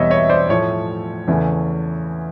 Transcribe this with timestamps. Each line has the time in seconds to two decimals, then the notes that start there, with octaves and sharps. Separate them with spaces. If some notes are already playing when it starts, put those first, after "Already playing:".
Already playing: E2 B2 G3 B3 C#5 D#5 E5
0.10 C#5 D#5
0.29 C5 D5
0.49 A2 F3 A3 C#5
1.28 E2 C#3 E3 A3